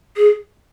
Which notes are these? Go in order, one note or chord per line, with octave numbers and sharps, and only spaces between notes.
G#4